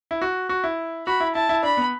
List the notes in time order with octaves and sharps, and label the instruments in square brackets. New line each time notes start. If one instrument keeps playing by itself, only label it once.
[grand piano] E4
F#4
F#4
E4
[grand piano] F#4 [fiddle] B5
[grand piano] E4
[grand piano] E4 [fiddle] A5
[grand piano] E4
[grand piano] D4 [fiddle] B5
[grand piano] B3